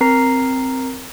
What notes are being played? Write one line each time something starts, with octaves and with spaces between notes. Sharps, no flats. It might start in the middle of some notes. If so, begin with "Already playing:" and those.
C4 A#4 A#5 C7